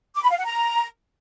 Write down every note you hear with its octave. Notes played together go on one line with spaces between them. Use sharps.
D6
B5
F5
F#5
A#5